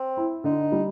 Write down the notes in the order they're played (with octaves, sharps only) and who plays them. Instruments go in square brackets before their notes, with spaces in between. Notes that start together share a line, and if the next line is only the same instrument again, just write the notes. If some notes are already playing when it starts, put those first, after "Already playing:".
Already playing: [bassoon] C4
[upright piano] E4
[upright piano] D3 [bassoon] D#4
[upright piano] G3